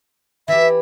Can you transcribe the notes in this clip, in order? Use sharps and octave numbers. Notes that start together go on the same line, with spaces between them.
E3 G4 E5